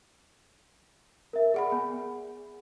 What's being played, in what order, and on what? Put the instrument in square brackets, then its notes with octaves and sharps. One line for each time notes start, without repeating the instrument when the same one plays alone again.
[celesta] A#4 E5
[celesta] G#4 [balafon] D5 F#5 B5
[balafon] B3